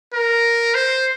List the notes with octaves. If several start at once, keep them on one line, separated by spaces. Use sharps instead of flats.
A#4
C5